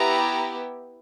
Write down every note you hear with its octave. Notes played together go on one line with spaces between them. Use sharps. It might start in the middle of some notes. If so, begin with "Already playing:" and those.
Already playing: B3 E4 G4 A#5